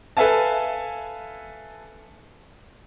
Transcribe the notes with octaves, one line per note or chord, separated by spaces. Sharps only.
A4 B4 E5 F5 G#5 A5